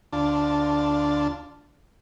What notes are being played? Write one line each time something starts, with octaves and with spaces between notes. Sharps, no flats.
D2 D4 F4 A5